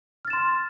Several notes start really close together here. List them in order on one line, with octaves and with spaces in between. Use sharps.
F6 A6 E7 C6